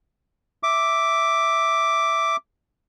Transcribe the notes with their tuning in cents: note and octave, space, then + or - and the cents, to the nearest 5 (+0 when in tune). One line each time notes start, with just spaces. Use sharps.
E5 -5 D6 +0